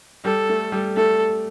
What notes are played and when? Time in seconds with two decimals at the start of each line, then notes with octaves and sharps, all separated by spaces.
0.25 G3 A4
0.49 A3
0.72 G3
0.96 A3 A4